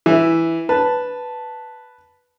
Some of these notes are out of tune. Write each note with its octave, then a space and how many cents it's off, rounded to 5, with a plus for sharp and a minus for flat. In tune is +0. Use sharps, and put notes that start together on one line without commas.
E3 +0 E5 -10
B4 +0 A5 +0